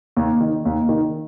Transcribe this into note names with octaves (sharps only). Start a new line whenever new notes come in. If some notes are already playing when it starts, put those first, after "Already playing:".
D#2
D#3
D#2
D#3